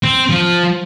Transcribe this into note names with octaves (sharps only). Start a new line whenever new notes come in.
C4
F3